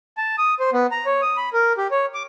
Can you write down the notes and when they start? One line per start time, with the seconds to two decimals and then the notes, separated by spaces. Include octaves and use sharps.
0.17 A5
0.38 D#6
0.60 C5
0.73 B3
0.91 A#5
1.06 C#5
1.22 D#6
1.37 B5
1.53 A#4
1.78 G4
1.91 C#5
2.14 D6